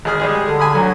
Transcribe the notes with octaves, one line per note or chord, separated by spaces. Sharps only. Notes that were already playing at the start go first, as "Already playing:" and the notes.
G#1 G#4 F6
G3 G#3 G#4
D3
G#5 B5 D#6
D2 F#3